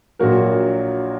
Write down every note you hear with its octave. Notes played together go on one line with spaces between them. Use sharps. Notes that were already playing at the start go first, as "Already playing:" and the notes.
A#1 A#2 F#3 A#3 F#4 A#4